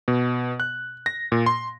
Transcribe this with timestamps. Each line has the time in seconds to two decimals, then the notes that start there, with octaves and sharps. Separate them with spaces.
0.08 B2
0.60 F#6
1.06 A#6
1.32 A#2
1.46 C6